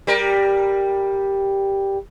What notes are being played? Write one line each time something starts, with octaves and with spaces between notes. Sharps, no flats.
G3 A#4